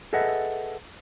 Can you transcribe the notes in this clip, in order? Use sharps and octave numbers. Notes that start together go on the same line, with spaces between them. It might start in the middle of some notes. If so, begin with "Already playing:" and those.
G#4 A4 B4 D#5 E5 F#5